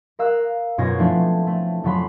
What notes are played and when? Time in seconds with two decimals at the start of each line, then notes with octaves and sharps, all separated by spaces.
0.19 A#4 F5 E6 F#6
0.78 F#2 B2 C#4 F4 G#6 A#6
0.98 F3 A3 C4 D4 E4 F4
1.47 A3
1.84 F2 C#3 F#3 F4 B5 C6